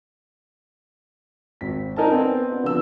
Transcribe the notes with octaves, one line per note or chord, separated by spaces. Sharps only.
G#1 C4 B6
D4 D#4 A#4 G#5 A5
B3 C4
B3 D4
D3 F3 B4 E6